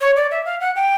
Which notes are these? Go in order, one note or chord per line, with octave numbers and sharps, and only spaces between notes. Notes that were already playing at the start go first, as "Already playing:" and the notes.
C#5
D5
E5
F5
F#5
G5